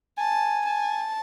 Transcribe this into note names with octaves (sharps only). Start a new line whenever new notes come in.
G#5 A5
A5